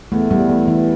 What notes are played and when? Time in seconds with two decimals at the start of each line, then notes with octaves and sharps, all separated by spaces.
0.12 E2 A3
0.30 E2 G3
0.49 E3 A3
0.67 E3 E4